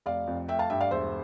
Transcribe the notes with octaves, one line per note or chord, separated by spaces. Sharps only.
F1 D5 F5
F2
A3 E5 G5
F5 A5
G2 E5 G5
D5 F5
E1 C5 E5